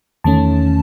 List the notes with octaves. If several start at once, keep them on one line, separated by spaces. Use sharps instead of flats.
E2 D#3 A3 C#4 A5